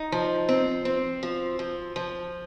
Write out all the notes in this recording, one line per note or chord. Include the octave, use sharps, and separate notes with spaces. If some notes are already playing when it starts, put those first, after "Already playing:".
Already playing: D#4
F3
C4
C4
F3
F3
F3